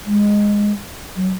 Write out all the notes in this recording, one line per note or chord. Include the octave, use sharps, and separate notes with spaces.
G#3
F#3